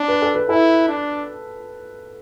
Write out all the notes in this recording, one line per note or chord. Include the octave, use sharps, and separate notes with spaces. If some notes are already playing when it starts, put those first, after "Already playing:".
Already playing: D4
B4
A4
B4
E4 A4
D4